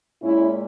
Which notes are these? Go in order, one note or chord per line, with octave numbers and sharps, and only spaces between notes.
A#2 G#3 C#4 E4